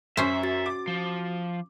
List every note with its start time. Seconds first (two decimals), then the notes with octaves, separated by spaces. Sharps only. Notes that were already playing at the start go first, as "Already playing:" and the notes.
0.17 F#2 C#4 C5 E5
0.43 F#4 A6
0.66 D6
0.87 F3